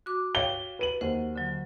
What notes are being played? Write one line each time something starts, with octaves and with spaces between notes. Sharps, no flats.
F#4 D6
C#5 F5 G5 G7
B4 D#7 F#7
D#2 C5 F#5
D3 F#3